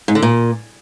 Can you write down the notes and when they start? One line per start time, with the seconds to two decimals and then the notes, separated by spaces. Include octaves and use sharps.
0.08 G#2
0.15 D3
0.22 A#2